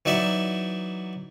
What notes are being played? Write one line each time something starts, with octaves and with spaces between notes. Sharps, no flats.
E3 F#3 D#4 D5 E5